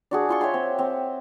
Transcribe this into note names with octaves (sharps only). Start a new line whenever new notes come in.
D4 F#4 G#4
F4 C6 C#6
C#5 E5 G5 C6
C4
C4